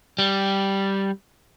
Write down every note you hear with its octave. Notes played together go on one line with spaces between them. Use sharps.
G3